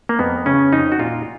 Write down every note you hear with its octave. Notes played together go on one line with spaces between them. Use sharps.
A#3
F2 B3
C#3 C#4
F2 D#4
F#4
A#2 F4